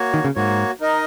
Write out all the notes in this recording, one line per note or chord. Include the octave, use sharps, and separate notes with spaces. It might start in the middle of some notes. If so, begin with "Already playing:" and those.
Already playing: A#3 F#4 C#5
D#3
C#3
G#2 A#3 F#4 C#5
D#4 A#4 D#5